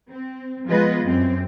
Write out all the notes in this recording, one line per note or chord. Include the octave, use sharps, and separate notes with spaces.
C4
F3 G#3 B3 F4 B4 D#5
F#2 C4